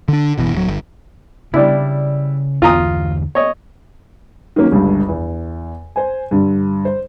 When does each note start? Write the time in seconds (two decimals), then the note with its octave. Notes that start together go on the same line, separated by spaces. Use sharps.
0.08 D3 D4
0.38 F#1 B2 E3
0.52 D1 F#3
0.68 G1
1.54 C#3 G3 D4 E4
2.62 E2 D3 E3 F4 A#5 D#6
3.35 C#5 D#5
4.56 D#3 F#3 A#3 C#4
4.71 G1 C#2 G2 D3
5.09 E2
5.96 C5 G#5
6.31 G2 D3
6.85 C5